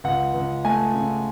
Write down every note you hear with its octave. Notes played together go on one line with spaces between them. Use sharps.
C#2 F#5
C#2
A3 G#5
C#3